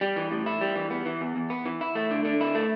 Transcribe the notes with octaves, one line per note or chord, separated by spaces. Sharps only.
G3
E3
A2
E4
G3
E3
B3
E3
E2
E2
B3
E3
E4
A3
D3
D3
E4
A3